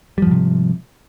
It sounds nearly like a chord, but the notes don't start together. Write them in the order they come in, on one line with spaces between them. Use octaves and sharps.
G3 F3 G#2 C3